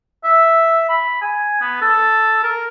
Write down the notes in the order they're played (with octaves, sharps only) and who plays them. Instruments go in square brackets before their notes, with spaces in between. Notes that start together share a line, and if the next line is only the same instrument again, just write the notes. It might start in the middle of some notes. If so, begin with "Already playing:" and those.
[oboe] E5
B5
G#5
B3
A4
A#4